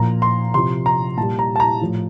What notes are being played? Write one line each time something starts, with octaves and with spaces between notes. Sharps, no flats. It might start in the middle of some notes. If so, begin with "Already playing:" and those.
Already playing: A#2 F3 A#5
C6
C3 F3 C6
A#5
A#2 G3 A5
A#5
A5
A#5
A2 F3